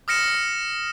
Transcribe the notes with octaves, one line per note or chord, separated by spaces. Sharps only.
D#6 F6 A#6 C#7 E7